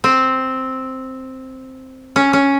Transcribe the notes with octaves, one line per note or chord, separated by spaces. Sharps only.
C4
C#4
C#4